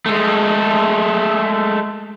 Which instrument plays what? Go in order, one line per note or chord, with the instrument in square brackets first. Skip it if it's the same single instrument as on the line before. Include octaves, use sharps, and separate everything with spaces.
[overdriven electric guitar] G#3 A3